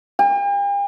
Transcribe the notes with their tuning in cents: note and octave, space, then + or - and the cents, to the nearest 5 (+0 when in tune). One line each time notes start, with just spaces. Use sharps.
G5 +45